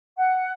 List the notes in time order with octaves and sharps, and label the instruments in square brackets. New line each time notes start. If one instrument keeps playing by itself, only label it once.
[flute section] F#5